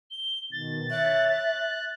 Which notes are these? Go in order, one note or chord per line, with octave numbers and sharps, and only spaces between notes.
G7
B2 D#3 A6
C#5 E5 F#6
F#6